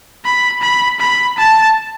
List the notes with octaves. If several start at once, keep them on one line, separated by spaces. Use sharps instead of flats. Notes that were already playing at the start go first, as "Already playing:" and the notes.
B5
B5
B5
A5